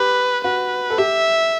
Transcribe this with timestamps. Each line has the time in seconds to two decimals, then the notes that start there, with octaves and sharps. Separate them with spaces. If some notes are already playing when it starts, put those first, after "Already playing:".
Already playing: G4 B4
0.44 F#4 B4
0.90 A4
0.98 G4 E5